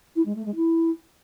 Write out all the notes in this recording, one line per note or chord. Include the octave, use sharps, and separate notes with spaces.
E4
G#3
A3
G#3
E4